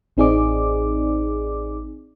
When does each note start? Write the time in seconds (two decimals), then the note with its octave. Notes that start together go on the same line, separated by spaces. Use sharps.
0.17 A1 C4 D#4 G#4 D5 D6